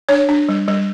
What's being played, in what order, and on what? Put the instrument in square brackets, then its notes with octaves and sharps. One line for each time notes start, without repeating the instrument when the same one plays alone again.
[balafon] D4 C#5
D4
G3
G3